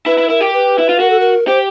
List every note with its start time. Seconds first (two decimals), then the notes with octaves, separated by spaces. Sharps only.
0.06 E4 B4
0.18 E4
0.29 E4 A#4
0.41 G4
0.53 B4
0.78 E4
0.89 F4
0.99 F#4 A#4
1.10 A4
1.20 A#4
1.47 G4 C5